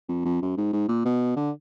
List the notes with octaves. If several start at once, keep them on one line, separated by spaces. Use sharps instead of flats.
F2
F2
F#2
G#2
G#2
A#2
B2
D3